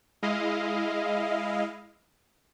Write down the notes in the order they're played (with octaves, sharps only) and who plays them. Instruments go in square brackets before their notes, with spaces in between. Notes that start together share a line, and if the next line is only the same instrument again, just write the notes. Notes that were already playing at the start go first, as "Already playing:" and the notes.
[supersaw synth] G#3 E4 D#5 F5